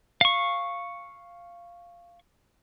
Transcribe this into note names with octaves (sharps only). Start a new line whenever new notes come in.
F5 C#6